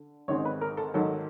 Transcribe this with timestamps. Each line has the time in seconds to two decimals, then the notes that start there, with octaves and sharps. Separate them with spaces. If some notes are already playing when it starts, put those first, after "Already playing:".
Already playing: D3
0.28 G#1 G#2 D#3 G#3 C4 C#5
0.45 B4
0.61 A#4
0.77 A4
0.94 G#2 D#3 F#3 A4